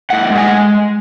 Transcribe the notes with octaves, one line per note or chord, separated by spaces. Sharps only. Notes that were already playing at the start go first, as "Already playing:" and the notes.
A2 F#5
G#3
G#5